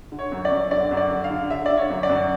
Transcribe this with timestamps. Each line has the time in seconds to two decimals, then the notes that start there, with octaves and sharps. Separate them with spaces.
0.12 D3
0.19 C#5
0.32 F#2
0.45 D5
0.51 F#2
0.71 D3 D5
0.91 F#2
0.97 D5
1.11 D3
1.24 F5
1.30 D3
1.50 D3 E5
1.66 D3 D5
1.77 C#5
1.90 F#2
2.03 D5
2.09 F#2